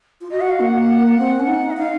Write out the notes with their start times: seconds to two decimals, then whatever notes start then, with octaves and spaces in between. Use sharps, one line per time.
0.21 F4
0.31 F#4 D#5
0.41 F#5
0.50 F5
0.60 A#3 F#5
1.18 C4
1.40 C#4
1.47 D#4
1.70 D#5
1.77 D#4 F5